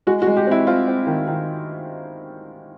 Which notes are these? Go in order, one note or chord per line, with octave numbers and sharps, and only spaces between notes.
G#3 F#4
F#4
G#3
G4
C4 E4
C4 F4
C4
D#3
D#3